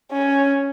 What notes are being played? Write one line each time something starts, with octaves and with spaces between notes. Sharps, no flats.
C#4